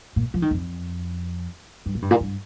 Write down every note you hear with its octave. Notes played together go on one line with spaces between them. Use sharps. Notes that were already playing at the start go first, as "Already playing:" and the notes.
A#2
F3
D#3
F2
G2
A#2
G2
A#2
G2